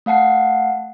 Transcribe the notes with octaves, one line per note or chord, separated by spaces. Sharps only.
A3 F5 F#5 A5 C7